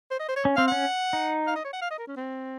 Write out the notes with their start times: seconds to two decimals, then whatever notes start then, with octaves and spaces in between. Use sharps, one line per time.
0.11 C5
0.20 D#5
0.29 C5
0.36 C#5
0.45 C#4
0.57 C4 F5
0.68 C#4 F#5
1.13 D#4
1.48 F5
1.56 D#5
1.64 C#5
1.73 F#5
1.82 F5
1.91 D#5
1.99 A#4
2.08 C#4
2.17 C4